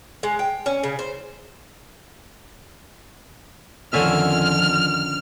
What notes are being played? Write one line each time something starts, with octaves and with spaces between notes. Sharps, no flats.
G#3
G5
C#4
C#3
C5
F2 D3 D#3 C#4 F4 E5 F6